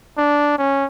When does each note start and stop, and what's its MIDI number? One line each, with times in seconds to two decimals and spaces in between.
0.18 0.56 62
0.58 0.85 61